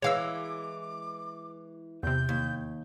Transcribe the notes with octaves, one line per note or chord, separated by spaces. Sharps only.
E3 G#3 C#5 F5 D6 E6
E2 C3 G6
D#2